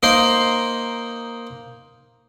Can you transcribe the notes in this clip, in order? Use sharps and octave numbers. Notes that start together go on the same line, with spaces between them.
A#3 D#4 A#4 C5 C6